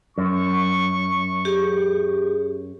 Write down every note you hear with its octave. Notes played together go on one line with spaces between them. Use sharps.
F#2 C#6
G4 G#4